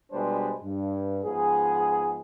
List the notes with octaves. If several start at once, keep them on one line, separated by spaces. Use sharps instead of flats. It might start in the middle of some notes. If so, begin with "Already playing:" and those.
B2 G3 G#3 D4 B4 C5
G2
G#2 F3 B3 G#4